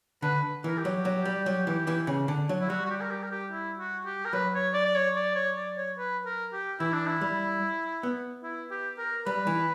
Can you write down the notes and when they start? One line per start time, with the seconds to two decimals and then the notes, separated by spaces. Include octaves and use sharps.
0.22 D3 B4
0.64 E3 A#4
0.77 G4
0.85 F#3
1.05 F#3
1.25 G3
1.46 F#3
1.67 E3
1.87 E3
2.07 C#3
2.28 D3
2.49 F#3
2.61 E4
2.69 G3 F#4
2.86 F#4
2.90 G4
3.01 A#4
3.10 G4
3.23 A#4
3.31 G4
3.52 E4
3.79 F#4
4.05 G4
4.25 A#4
4.33 F#3 B4
4.54 C#5
4.74 D5
4.85 D5
4.96 C#5
5.16 D5
5.35 C#5
5.56 D5
5.77 C#5
5.98 B4
6.26 A#4
6.53 G4
6.80 E3 E4
6.93 D4
7.07 E4
7.21 G3
8.03 B3
8.43 E4
8.71 G4
8.98 A#4
9.26 G3 B4
9.47 E3